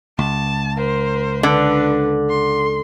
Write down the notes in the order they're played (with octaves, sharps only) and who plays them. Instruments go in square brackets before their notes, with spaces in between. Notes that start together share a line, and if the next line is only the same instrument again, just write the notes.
[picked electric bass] C#2 [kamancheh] A5
[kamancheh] A#4 C5
[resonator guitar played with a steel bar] D3 [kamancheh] D4 B4
[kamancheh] C6